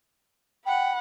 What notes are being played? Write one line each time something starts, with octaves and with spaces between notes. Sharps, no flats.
F#5 G5 B5